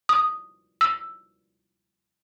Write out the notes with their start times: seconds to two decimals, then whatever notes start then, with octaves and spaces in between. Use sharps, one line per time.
0.09 D#6
0.81 E6